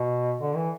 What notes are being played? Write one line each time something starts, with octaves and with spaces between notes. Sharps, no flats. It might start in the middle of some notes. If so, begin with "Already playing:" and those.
Already playing: B2
D3
E3